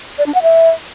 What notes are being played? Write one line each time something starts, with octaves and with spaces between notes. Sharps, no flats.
D5
D4
F#5
E5